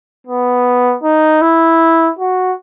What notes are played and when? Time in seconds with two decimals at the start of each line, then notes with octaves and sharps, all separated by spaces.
0.27 B3
1.03 D#4
1.41 E4
2.19 F#4